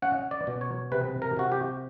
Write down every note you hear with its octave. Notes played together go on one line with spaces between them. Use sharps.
C#4 F#5
D5
B2
C#5
C3 B4
A#4
C3 F#4
G4